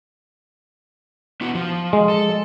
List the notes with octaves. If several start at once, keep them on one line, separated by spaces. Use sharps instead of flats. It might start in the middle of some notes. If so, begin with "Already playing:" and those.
B3 E4 F#4
F3
G#3
A4